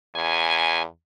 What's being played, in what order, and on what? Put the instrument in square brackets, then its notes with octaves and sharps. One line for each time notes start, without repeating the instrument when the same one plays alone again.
[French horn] E2 [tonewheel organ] G#5